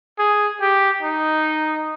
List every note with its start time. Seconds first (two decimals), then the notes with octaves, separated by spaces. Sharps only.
0.19 G#4
0.61 G4
1.02 D#4